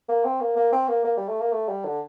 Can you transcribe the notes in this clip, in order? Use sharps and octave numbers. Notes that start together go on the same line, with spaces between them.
A#3
C4
A#3
A#3
C4
A#3
A#3
G3
A3
A#3
A3
G3
D3